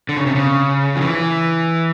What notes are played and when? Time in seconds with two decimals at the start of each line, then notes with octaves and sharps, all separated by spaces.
0.09 D3
0.17 C#3
0.26 C3
0.35 C#3
0.96 F3
1.01 E3